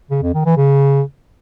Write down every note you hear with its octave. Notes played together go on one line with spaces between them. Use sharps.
C#3
F2
D#3
E3
C#3